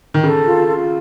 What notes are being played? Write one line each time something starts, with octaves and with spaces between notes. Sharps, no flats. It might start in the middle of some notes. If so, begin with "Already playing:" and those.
D#3
C#3 A4
F4
F4